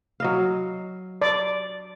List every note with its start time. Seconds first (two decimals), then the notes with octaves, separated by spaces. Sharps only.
0.20 F#3 D#5 F5
1.22 D5